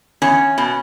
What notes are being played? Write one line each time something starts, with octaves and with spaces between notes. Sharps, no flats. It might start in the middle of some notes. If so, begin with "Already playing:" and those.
E2 C#4
B2